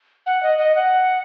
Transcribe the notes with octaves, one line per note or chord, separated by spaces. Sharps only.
F#5
D#5
D#5
F#5